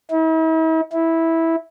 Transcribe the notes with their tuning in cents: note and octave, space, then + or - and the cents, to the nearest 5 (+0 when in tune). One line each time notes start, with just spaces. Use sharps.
E4 -45
E4 -10